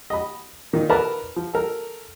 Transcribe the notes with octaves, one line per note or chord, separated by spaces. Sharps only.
D#5 B5
A#2 D#3 D#4
A#4 B4 D5 E5 F#5 A5
F3
A4 A#4